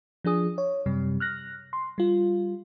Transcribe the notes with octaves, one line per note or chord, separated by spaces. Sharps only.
F3 D4 G#4 D#6
C#5
F#2 C3 G3
F6 F#6 A#6
C6
G3 F4